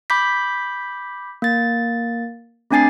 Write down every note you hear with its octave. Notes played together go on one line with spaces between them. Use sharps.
B5 D6 G6 B6
A#3 A6
A3 C4 D4 G#5 A6 C7